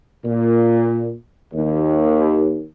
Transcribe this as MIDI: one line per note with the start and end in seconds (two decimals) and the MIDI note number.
0.25 1.11 46
1.53 2.64 39